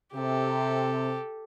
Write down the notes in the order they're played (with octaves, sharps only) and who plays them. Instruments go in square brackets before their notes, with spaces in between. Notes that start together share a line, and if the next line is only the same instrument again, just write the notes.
[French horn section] C3 [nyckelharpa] G4 A4